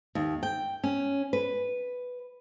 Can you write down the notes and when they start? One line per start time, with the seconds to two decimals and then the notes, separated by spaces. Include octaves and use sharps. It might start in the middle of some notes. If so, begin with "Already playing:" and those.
0.15 D#2
0.43 G5
0.84 C#4
1.33 B4